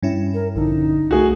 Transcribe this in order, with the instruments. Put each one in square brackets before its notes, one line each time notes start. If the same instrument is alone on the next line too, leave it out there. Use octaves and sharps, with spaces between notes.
[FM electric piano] G2 C#4 E4
[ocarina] A#4
[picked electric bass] A#1 D3 [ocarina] D#4
[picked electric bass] C2 A3 [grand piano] F#4 G#4